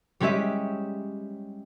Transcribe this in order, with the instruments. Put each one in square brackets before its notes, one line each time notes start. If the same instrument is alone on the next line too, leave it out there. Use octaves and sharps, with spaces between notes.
[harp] G3 G#3 C#4 G4 E5